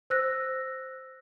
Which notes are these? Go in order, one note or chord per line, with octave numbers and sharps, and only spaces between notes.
C5 E6 F#6 A#6